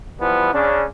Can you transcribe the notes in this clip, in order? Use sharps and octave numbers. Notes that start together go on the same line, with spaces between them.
E3 F3 G3 B3
C#3 C#4 D4